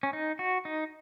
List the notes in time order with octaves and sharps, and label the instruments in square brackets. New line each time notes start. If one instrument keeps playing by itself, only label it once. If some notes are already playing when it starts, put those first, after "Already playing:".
[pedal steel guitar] C#4
D#4
F#4
D#4